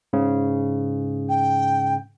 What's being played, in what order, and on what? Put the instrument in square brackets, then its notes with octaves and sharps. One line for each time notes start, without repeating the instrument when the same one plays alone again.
[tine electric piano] G#2 C#3
[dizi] G5